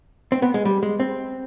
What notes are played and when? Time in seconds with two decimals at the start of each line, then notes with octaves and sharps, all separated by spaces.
0.32 C4
0.42 B3
0.54 G#3
0.65 G3
0.83 G#3
1.00 C4